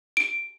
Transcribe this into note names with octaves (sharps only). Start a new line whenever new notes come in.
D7